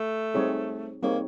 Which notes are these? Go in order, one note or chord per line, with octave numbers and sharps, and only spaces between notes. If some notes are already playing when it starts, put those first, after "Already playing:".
Already playing: A3
G3 C4 D#4 G#4 C#5
G3 A#3 C4 D#4 G#4 C#5